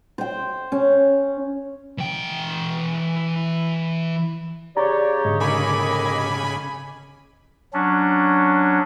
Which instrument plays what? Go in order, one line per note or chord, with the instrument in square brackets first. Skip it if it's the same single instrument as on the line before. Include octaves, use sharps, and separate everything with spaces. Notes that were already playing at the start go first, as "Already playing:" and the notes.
[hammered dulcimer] C5 G5
C#4
[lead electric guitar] E3 G5
[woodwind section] C#3 G4 C#5 [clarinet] D5 [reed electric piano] A#5
[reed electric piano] G#2 D3 [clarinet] D#5
[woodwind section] D#2 A4 D6 [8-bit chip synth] C#3 G#5 B5
[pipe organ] F#3 C#4 D4